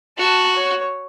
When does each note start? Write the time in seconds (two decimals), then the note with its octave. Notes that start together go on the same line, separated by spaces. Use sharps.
0.18 F#4 A5
0.56 C#5